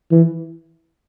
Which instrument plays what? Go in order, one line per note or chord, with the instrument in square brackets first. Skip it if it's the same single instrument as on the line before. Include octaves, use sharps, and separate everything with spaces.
[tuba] E3